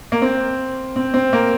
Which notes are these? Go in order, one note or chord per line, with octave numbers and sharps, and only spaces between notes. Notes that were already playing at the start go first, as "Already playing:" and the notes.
A#3
C4
C4
C4
A#3